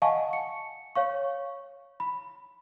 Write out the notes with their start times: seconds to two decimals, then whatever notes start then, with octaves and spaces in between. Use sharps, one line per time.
0.02 D#5 F5 F#5 G#5 A5 C#6
0.33 C#7
0.95 C#5 F5 C#6
2.00 B5